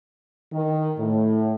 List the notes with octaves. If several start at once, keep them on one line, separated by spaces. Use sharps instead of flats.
D#3
A2